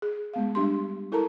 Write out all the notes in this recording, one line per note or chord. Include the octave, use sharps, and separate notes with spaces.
G#4
G#3 B3 F5
F#3 G3 D4 G4 C6
E4 A4 A#4 A5 A#5